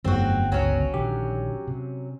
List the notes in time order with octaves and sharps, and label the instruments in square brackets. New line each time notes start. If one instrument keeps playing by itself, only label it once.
[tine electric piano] G1 [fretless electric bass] F2 F#3 A3 [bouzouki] C4 F#4
[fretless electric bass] C#2 A3 B3 [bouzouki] F#3 C#4
[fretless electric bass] A#1 D3 D#3 [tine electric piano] G4
[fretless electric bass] C3